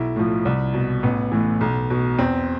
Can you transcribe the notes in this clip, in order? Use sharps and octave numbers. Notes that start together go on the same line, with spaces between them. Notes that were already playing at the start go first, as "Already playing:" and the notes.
Already playing: B1 E4
A2 F3
C2
B2
A1 B3
A2 E3
B1
B2
E2 C4